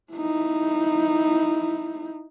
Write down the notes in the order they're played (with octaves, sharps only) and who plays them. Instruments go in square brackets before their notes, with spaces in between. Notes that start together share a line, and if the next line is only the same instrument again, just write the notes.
[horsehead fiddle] D#4 E4